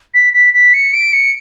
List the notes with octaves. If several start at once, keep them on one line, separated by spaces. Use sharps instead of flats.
B6
B6
B6
C#7
D7
C#7